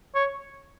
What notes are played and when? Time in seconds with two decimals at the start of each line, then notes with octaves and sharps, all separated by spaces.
0.15 C#5